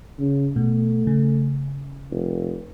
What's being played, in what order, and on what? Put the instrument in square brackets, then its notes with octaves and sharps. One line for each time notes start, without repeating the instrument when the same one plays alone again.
[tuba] C#3
[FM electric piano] B2 [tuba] A3
[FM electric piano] C#3
[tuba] F1